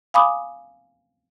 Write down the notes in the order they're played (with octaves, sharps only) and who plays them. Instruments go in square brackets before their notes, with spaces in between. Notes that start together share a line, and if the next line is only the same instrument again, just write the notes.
[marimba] F5 G#5 B5 D6 D#6